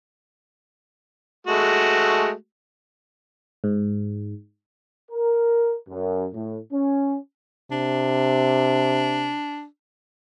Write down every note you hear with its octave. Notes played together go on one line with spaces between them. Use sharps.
G#3 A3 F#4
G#2
A#4
F#2
A2
C#4
C3 D4